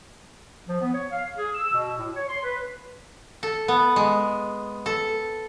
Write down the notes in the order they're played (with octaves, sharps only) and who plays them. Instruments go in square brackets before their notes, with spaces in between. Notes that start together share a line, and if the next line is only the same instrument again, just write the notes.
[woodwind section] F3
B3
C#5
F5
G#4
E6
B2
A2
C#5
C6
B4
[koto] A4
B3
G#3
A4